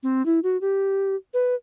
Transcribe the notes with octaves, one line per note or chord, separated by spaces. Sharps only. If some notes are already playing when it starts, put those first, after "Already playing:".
C4
E4
F#4
G4
B4